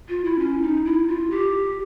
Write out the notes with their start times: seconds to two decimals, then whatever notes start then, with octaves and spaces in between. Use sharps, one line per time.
0.09 F4
0.25 E4
0.39 C#4
0.62 D#4
0.85 E4
1.08 F4
1.30 G4